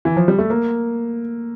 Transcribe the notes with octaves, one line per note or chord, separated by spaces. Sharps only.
E3
F3
G3
A3
A#3